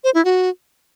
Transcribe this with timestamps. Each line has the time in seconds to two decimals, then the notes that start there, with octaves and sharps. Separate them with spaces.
0.04 C5
0.15 E4
0.25 F#4